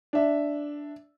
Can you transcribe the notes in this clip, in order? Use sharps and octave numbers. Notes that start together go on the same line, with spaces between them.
D4 E5